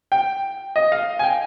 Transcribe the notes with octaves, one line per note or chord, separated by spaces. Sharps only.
G5
D#5
F5
G#5
G5